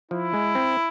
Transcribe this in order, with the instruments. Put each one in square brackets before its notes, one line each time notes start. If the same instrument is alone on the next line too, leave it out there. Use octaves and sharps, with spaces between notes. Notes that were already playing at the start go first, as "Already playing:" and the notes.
[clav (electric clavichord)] F3 [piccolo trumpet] E4
[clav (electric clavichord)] G#3
C4